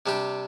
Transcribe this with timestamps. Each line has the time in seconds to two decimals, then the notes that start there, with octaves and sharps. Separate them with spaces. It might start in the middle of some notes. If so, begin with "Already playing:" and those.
0.06 C3 G3 D4 G4